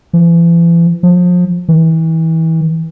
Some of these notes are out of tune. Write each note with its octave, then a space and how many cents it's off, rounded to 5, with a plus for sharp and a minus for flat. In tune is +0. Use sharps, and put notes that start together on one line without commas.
E3 +40
F3 +30
E3 -30